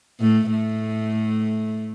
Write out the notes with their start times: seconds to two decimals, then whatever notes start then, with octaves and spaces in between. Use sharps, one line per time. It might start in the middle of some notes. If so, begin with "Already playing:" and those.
0.20 A2 A3
0.52 A2 A3